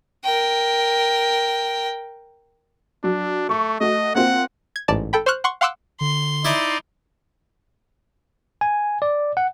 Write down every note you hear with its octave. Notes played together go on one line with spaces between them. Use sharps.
A#4 G5
F#3 D4
A3 C#6
A3 F#4 D#5
A#3 C4 F4 F#5
G#6
A1 G#2 D5 A5
A4 G5 B5
C5 C6 C#6 F6 F#6
F#5 C6 C#6
F5 F#5 C6 D6 E6 F#6
D3 C6
D#4 E4 D5 E5 B5
G#5
D5
F#5